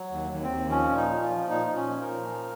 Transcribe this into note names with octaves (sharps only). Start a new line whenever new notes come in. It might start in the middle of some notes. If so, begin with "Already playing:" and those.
Already playing: F#3
D#2
D#2
C4
D#2
F3 C#4
A#2
D#4
F3
F4
F3
A#2 D#4
A#2
C#4
F3
A#4
A#2
F3